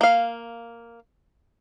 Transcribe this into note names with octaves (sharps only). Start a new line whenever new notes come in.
A#3 F5